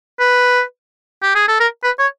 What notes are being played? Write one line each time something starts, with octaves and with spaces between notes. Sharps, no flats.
B4
G4
G#4
A4
A#4
B4
C#5